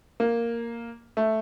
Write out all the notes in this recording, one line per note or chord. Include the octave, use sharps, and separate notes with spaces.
A#3
A3